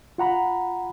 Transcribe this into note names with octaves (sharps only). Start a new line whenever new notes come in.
F4 F#5 A#5 B5